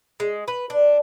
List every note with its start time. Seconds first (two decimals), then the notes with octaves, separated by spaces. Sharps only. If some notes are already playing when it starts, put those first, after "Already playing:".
0.20 G#3
0.48 B4
0.70 D4